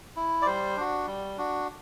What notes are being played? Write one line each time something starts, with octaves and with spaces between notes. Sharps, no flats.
E4
D5
G3 C5
D4 F#4
G3
D4 F#4